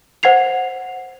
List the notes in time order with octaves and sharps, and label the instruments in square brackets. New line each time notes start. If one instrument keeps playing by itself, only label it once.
[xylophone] C5 F#5 G#6 C7 F7